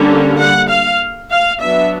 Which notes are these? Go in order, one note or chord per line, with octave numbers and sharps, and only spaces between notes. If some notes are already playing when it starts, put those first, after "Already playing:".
Already playing: D3 G3 A#3 C#4
F#5
F5
F5
F#3 B3 D4 E5